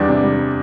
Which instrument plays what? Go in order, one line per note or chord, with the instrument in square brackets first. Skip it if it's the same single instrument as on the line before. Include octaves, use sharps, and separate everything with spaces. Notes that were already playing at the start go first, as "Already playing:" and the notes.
Already playing: [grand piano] E2 G3 D4
C3
G3